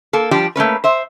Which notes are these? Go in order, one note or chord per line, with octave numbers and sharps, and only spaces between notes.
A#3 A4
F3 G3 D4 G4
A3 A#3 C#4 B4
C5 E5